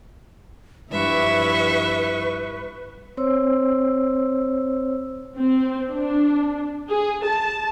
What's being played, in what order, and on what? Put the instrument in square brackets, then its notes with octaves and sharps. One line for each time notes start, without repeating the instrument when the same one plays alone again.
[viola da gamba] G2 F3 E4 [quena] B4 [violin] E5 C#6
[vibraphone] C4 C5 C#5 E6
[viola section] C4
D4
G#4
A5